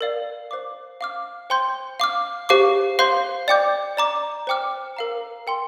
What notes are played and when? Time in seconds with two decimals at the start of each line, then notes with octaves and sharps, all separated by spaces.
0.01 A#4 D5 F5
0.51 C5 F5 D6
1.01 F5 D6 F6
1.50 C5 G5 C6 G6
2.00 F5 D6 F6
2.49 G4 C5 F5 D6
2.99 C5 F5 C6 G6
3.48 D5 G5 D6 G6
3.97 D5 A#5 D6
4.47 C5 G5 D6 F6
4.97 A#4 F5 A#5
5.47 A#4 G5 C6